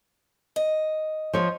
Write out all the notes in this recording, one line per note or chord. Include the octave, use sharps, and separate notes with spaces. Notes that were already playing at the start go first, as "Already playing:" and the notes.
D#5
F3 C#5